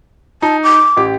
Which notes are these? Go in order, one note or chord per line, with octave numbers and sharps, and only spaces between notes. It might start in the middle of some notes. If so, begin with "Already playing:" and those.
D#4 A5
D6
A1 G4